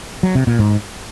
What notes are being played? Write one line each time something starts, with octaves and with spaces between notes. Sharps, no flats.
F#3
C3
A#2
G#2